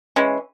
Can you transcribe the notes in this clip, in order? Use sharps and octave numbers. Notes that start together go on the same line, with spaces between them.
E3 G#3 C#4